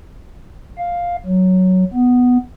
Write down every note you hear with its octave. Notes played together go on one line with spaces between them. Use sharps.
F5
F#3
B3